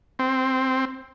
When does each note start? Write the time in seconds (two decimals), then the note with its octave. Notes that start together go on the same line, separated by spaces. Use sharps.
0.19 C4